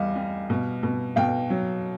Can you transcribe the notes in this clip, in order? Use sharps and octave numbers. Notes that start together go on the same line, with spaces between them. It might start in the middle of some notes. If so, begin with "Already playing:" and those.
Already playing: E2 G3 D#5 F5
G3
B2
B2
B2 F5 G5
F#3